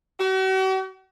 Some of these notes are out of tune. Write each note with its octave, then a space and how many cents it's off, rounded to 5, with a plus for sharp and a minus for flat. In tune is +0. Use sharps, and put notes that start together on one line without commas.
F#4 +45